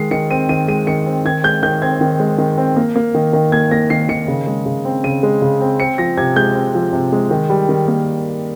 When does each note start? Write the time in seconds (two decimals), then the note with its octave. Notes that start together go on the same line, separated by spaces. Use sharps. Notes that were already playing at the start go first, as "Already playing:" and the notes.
Already playing: D#3 G#3 C7
0.11 D#3 C#7
0.31 C4 D#7
0.49 D#3 D#7
0.68 G#3 D#7
0.87 D#3 C#7
1.06 C4
1.25 D#3 G#6
1.44 G#3 G6
1.63 D#3 G6
1.82 C4 G#6
2.01 D#3
2.20 G#3
2.38 D#3
2.58 C4
2.76 A#3
2.96 A#3
3.15 D#3
3.33 D#3
3.52 A#3 G#6
3.71 A#3 A#6
3.90 D#3 C7
4.09 D#3 C#7
4.28 C#3
4.47 G#3
4.66 C#3
4.85 C4
5.04 C#3 D#7
5.23 G#3
5.42 C#3
5.61 C4
5.80 C4 C#7
5.98 F3 A#6
6.17 C3 G#6
6.36 G#3 G6
6.55 C4
6.75 F3
6.93 C3
7.12 G#3
7.31 D#3
7.50 G3
7.69 D#3
7.88 A#3